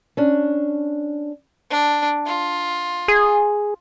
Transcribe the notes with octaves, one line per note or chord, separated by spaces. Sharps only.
C#4 D4
D4
F4
G#4